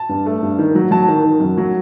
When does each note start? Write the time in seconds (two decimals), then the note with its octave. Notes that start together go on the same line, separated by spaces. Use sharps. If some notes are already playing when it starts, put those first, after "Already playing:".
Already playing: A5
0.09 G2
0.26 A3
0.43 G2
0.59 D#3
0.75 F#3
0.91 F#3 A5
1.08 D#3
1.24 D#3
1.40 F#2
1.58 F#3